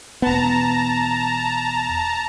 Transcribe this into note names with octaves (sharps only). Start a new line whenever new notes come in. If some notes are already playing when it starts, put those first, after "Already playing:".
E1 B3 A5 A#5